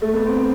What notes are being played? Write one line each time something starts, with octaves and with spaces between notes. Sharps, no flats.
A3
B3
C4
C4